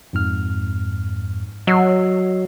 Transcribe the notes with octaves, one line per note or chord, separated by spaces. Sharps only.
F2 G#2 F6
F#3 D#5 E6 C7